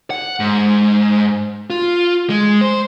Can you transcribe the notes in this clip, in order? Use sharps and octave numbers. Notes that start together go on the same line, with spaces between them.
F#5
G#2
F4
G#3
C5